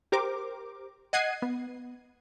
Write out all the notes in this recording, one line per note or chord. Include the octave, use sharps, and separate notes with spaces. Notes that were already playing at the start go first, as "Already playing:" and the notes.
G4 A#4 C5 D6
D#5 F#5 G#6 C7 D#7
B3